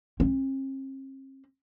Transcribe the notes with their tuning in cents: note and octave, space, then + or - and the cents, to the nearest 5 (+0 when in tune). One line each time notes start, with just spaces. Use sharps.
C4 +45